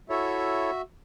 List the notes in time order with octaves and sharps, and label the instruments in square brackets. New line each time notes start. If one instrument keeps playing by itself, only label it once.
[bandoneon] E4 A4 C#5 [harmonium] F#4 E5